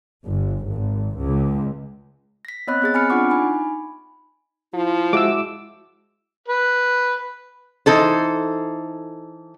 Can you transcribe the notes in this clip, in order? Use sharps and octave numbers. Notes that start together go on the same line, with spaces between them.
G1
G#1
C#2
A#6 B6
B3 C4 C#5 D#5 B5 F#6
B3 G#4 A6
C4 G#5 B5 F6 C#7
D4 F4 F#5 C#6 D6
D#4 G#5 B5
F3 E4
G#3 F#4 E5 D6 E6
B4
E3 D#4 A4 C5